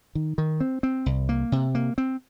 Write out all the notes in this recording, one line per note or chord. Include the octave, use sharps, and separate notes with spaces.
D#3
D#3
C4
C4
C2
A#3
C3
A#3
C4